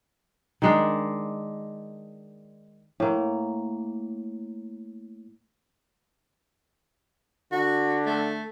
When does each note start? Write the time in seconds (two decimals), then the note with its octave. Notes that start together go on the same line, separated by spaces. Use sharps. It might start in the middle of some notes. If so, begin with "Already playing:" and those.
0.62 D#3 G#3 D4
3.00 A2 A#3
7.52 D3 F#4
8.06 A3